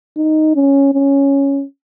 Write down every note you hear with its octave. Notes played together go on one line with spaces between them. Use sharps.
D#4
C#4
C#4